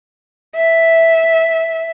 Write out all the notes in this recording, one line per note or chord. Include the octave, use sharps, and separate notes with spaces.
E5